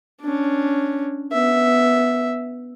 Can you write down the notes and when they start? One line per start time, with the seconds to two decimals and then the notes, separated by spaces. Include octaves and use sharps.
0.21 C#4 D4
1.32 B3 E5